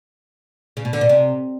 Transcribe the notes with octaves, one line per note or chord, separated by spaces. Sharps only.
C#3
B2
D3
B2
C3